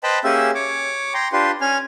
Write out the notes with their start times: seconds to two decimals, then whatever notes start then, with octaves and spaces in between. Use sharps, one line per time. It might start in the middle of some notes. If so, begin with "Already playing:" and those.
0.03 B4 C5 D#5 G5 A5 B5
0.24 A#3 C#4 G4 G#4 E5 E6
0.55 C#5 D6
1.14 G5 A#5 C6
1.33 D4 F4 G4 B4 C6
1.61 C#4 G#5 F6